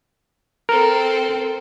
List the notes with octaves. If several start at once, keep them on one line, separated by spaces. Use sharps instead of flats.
C4 A4 A#4